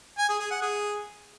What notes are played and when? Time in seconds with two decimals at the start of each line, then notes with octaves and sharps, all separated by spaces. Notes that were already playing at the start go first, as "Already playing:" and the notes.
0.18 G#5
0.29 G#4
0.40 G#4
0.51 F#5
0.62 G#4